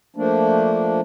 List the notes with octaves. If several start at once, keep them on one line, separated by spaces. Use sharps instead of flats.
F3 A3 A#3 D4